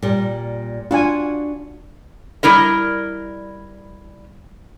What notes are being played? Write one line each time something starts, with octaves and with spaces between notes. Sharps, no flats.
A#2 G3
D4 F4 F#4 G#5
G3 E4 A#4 D#5